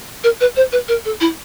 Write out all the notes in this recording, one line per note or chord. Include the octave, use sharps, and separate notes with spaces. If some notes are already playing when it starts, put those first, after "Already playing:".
A#4
B4
C5
B4
A#4
A4
E4